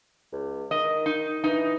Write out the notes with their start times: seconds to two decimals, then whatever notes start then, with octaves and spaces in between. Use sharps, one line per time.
0.32 C#2
0.71 D#3 D#5
1.06 D#4
1.44 E3 D#4